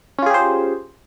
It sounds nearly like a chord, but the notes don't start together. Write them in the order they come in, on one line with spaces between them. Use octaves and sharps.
C#4 F4 G#4 G4 C5